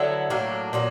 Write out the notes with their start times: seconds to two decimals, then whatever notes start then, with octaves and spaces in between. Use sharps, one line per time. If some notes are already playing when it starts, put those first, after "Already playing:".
Already playing: D3 F#3 B3 E4
0.30 A2 F#3 A#3 D4
0.73 A#2 F#3 B3